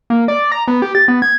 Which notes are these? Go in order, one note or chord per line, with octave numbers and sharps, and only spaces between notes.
A#3
D5
A#5
B3
G4
A6
B3
G#6